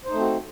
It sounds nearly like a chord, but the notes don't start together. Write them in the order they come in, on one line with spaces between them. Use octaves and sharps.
C5 D#4 A3 C4 F#4